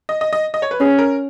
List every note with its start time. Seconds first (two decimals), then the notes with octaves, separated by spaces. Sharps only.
0.09 D#5
0.21 D#5
0.33 D#5
0.54 D#5
0.62 C#5
0.71 B4
0.80 C#4 G#4
0.98 A#4